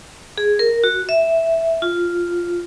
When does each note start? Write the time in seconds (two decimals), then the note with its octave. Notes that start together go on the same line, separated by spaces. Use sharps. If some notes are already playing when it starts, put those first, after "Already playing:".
0.38 G#4
0.59 A#4
0.84 F#4
1.09 E5
1.82 F4